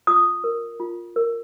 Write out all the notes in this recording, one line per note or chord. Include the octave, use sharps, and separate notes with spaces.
F4 D#6
A#4
F4
A#4